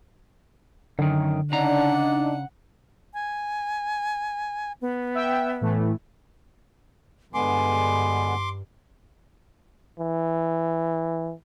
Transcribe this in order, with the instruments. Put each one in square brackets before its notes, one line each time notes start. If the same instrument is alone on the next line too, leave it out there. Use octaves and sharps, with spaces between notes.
[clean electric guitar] F#2 D#3 [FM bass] D3
[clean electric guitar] C#3 A#5 [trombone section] D4 D#4 [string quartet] F#5
[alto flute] G#5
B3
[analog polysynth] E5 G5 E6
A2 E3 A3
[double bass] G2 [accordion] D3 G#3 B3 [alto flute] G#5 [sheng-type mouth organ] C6 D6
[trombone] E3